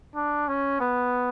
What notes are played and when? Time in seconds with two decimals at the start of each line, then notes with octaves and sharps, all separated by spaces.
0.16 D4
0.48 C#4
0.81 B3